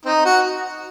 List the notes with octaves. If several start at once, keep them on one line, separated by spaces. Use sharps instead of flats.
C4 D#4
F#4